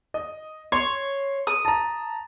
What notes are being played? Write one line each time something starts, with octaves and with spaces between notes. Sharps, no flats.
D#5
C#5 C6
D#6
A5 A#5